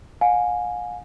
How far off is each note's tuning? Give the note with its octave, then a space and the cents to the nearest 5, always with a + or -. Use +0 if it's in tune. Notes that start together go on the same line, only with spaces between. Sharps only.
F5 +45 G#5 +0